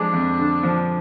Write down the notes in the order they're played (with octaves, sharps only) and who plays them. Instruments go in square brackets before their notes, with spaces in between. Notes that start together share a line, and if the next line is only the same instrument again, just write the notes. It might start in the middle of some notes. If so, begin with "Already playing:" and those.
Already playing: [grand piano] F2 F3 G#3 [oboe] D4
[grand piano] F2
D3
F3